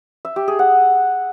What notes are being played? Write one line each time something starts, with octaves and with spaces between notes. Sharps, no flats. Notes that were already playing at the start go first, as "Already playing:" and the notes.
E5
G4
G#4
F#5